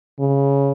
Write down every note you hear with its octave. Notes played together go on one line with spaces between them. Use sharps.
C#3